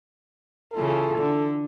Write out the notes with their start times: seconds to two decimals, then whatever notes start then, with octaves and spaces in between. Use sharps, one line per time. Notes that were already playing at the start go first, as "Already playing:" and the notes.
0.74 C#3 E3 F4 A4
1.18 D3